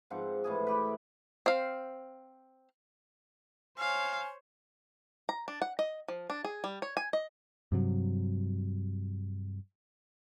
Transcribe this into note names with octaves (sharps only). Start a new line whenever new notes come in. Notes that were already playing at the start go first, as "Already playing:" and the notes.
G#2 F3 C4 F#5
A2 E3 G#4
E4 G4 B4
C4 F5
C5 C#5 F5 G#5
A#5
D4
F#5
D#5
F3
D4
G#4
G3
C#5
G#5
D#5
G2 C3 F#3